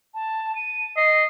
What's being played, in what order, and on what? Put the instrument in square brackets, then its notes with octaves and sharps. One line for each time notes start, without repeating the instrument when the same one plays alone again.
[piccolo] A5
D#7
[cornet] D#5 [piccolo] C7